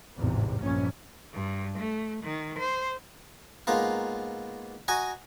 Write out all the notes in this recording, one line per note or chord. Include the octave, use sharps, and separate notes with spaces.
G#1 E2 A2 C3
A#1 G2 C#4
G2
A3
D#3
C5
G#2 A#3 B3 F4
F#4 D#5 G#5 A#5